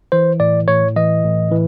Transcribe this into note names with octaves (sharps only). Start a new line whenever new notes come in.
E3 C5
A2 D5
A2 C#5
E3 D#5
A2
E3